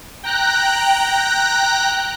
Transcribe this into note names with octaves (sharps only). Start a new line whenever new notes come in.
G5 A#5 F#6